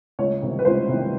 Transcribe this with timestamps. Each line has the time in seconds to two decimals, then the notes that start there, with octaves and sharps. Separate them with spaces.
0.19 C#2 C#5
0.41 C3 D#3 G3
0.59 B4
0.65 C#2 C5
0.89 C3 D#3 G3